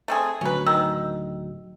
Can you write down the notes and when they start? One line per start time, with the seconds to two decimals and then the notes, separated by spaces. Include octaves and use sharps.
0.08 A3 C4 G#4
0.41 D1 D2 F#3 C#4 B4
0.66 D#3 E6